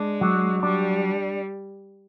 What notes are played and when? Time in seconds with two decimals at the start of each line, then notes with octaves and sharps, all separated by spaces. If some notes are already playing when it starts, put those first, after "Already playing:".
Already playing: G#3 D4
0.21 F#3
0.63 G3 D4